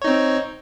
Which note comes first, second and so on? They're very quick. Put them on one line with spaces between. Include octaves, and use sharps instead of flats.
C#5 D#4 C4